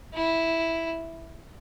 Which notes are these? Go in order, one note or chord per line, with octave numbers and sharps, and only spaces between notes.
E4